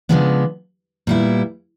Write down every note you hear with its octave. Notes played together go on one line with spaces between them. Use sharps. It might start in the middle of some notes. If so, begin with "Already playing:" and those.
C#3 F3 G#3 B3 D4
A#2 G3 B3 E4